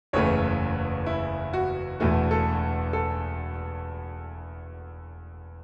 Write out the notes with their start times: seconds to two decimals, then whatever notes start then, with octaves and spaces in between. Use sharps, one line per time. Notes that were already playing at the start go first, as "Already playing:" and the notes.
0.13 F#1 E2 C#3 E3 A3 C#5
1.06 E4
1.54 F#4
2.00 E1 E2 E3 A3 F#4
2.31 A4
2.93 A4